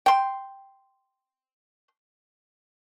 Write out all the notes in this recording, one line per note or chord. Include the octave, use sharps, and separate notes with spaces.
G5 C6